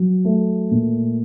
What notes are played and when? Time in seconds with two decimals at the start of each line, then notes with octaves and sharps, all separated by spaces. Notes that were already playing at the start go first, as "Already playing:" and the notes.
Already playing: F#3
0.25 A3
0.71 A#2